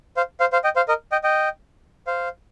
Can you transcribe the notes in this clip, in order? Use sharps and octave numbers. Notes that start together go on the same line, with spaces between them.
C5 F5
C5 F5
C5 F5
D#5 G5
C5 F5
A#4 D#5
D#5 G5
D#5 G5
C5 F5